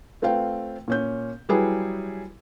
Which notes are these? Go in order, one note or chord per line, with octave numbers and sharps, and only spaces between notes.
A3 C4 F4 B4 F5 G5
A#2 C#4 G6
F#3 G3 E4 G#4 B4